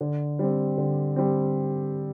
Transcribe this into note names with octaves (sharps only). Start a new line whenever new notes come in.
D3
G3 C4
D3
G3 C4